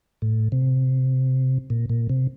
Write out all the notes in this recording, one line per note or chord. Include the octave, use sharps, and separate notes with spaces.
A2
C3
A#2
A#2
C3